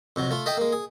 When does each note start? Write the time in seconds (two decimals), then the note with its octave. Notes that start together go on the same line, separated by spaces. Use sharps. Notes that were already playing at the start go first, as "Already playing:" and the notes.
0.16 F2 C3 F#3
0.31 A3 F4
0.46 A4 D#5 E5 G5
0.57 G#3 A#3
0.73 G#4